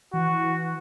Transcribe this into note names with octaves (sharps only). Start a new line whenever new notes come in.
E3 F#4